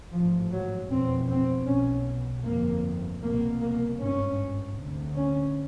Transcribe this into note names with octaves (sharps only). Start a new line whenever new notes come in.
A1 G#2 F3
F#3
F1 E2 B2 C4
C4
B1 B2 C#4
G1 F2 C3 A#3
C2 B2 A#3
A#3
G#1 G2 C#4
D2 C3
C#4